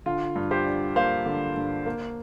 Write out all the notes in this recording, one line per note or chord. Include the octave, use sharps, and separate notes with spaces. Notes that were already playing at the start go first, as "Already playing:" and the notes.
D3 F4
G2
G4 C5
D4
A#3 C5 F5
D3
G2
A#3